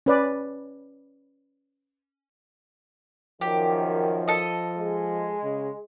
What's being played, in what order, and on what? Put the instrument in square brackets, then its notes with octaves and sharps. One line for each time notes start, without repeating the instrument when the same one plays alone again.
[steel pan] C#4 B4 D5
[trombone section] F#2 D#3 [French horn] F3 [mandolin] G4
[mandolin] A4 D#5
[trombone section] G#3
[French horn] C#3